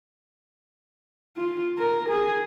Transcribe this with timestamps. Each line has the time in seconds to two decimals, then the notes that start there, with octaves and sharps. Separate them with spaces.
1.37 F4
1.78 A#4
2.09 G#4